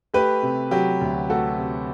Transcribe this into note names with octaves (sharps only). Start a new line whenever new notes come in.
A3 G4 B4
C3
F#3 G4
D2
A3 F#4 A4
C3